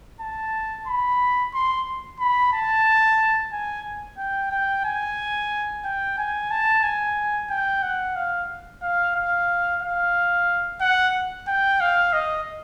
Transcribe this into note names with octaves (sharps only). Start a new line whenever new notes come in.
A5
B5
C6
B5
A5
G#5
G5
G5
G#5
G5
G#5
A5
G#5
G5
F#5
F5
F5
F5
F5
F#5
G5
F5
D#5